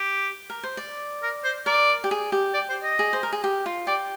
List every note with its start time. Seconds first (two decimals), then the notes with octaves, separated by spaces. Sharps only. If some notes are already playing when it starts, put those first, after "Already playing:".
Already playing: G4
0.50 A#4
0.63 C5
0.77 D5
1.23 A#4
1.44 C5
1.66 A#4 D5
2.04 G4
2.11 G#4
2.32 G4
2.54 D5
2.70 C5
2.84 D#5
2.99 G#4
3.13 C5
3.23 A#4
3.32 G#4
3.44 G4
3.66 F4
3.87 G4 D5